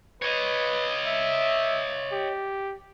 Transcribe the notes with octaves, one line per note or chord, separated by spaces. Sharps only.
B4 C#5 D#5
E5
G4